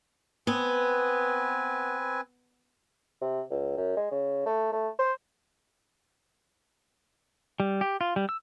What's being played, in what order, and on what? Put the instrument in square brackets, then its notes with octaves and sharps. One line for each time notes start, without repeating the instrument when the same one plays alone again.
[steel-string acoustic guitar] B3 [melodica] C4 B4 G#5
[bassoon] C3
C#2
F#2
G#3
C#3
A3
A3
C5
[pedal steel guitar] G3
G4
F4
G3
E6